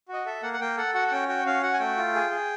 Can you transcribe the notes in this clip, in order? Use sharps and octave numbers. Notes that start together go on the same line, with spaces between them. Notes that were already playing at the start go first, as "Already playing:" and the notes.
F#4 D#5
A4 E5
A#3 F#5
F#5
A#3 G5
A4 F#5
F#4 F#5
F#5
C#4 G5
F#4 G5
C#4 F5
F#4 F#5
G#5
A3 G5
F4
G#4
G#4